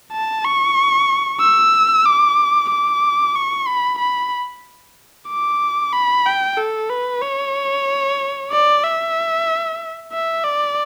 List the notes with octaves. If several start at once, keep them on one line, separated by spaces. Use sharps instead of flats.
A5
C#6
E6
D6
D6
C#6
B5
B5
D6
B5
G5
A4
B4
C#5
D5
E5
E5
D5